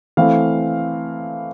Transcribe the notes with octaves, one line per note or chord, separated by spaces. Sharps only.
E3 A3 C4 F5